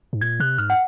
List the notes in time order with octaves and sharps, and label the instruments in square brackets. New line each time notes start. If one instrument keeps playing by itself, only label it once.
[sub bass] G#2
[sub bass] A#2 [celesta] G#6
[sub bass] C3 [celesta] F#6
[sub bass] G#2 [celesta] F6
[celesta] F#5